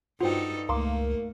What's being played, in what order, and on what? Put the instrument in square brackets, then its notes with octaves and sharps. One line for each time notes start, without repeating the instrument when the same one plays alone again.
[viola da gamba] G2 D#4 A4 [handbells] F4 C5 G5 [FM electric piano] F#4
[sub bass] C#2 [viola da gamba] A3 A#3 [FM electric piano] A#4 F5 [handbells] A#5 C6 D6